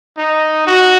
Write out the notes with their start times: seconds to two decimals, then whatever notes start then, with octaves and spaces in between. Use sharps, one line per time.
0.17 D#4
0.67 F#4